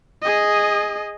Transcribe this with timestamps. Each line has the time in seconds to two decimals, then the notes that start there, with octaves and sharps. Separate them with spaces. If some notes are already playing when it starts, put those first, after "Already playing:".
0.22 G#4 D#5